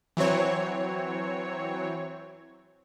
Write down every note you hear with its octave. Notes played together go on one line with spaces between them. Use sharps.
E3 F#3 C4 C#5